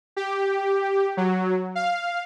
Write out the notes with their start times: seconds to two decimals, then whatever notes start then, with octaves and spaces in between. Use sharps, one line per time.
0.17 G4
1.17 F#3
1.75 F5